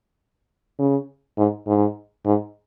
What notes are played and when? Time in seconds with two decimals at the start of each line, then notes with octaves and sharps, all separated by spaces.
0.79 C#3
1.38 G#2
1.67 G#2
2.25 G#2